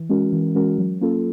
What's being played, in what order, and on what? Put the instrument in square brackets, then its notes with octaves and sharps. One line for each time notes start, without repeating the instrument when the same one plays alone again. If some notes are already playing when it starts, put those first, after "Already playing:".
Already playing: [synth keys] E3
G#3 C#4 F#4 A#4
E3
G#3 C#4 F#4 A#4
F#3
A#3 C#4 F4 A4